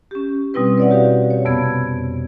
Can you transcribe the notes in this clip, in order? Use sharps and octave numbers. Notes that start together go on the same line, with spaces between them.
C#4 G4
B2 G3 C4 E4 B4
B4 C#5 D5 E5 F#5
F#4 G4 B4 F5
C#5
F2 C3 B3 B5 G#6